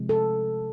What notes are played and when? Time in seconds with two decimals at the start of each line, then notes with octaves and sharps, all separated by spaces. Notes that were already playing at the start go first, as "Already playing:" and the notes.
Already playing: C3 F3 G#3
0.09 A4